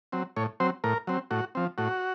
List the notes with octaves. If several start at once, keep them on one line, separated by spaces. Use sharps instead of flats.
F#3 C4
A2 C#5
F#3 C4 C5
A2 A#4
F#3 C4
A2 F#4
F3 C4
A2 F#4